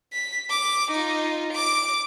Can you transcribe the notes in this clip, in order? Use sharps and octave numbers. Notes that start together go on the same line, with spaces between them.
B6
D6
D#4 F4
D6 D7